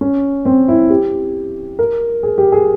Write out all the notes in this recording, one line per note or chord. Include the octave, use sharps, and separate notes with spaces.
C#4
C4
E4
G4
A#4
G#4
G4
G#4